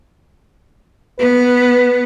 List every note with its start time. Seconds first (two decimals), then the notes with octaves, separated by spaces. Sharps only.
1.19 B3 B4